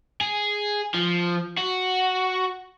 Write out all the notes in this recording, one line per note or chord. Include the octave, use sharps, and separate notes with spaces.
G#4
F3
F#4